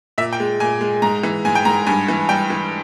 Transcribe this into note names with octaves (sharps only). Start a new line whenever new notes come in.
A#2 E5
G5
G#3
A#2 G#5
G#3
G#2 A#5
E3
G#2 G#5
G5
G#2 A#5
G2 G#5
E3
G3 G5
E3